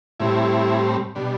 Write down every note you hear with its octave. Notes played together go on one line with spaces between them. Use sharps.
A2 G3 C4 E4
B2 G3 D4